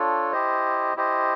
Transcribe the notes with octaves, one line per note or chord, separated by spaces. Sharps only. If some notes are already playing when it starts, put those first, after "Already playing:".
Already playing: D4 F4 A4 C#5
E4 G4 C5 D#5
E4 G4 C5 D#5